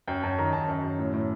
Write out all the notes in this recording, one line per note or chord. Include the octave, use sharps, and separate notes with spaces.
F#2 G5
F#2 A5
D#3 A#5
F#2 A5
F#2
F#2
A2
A2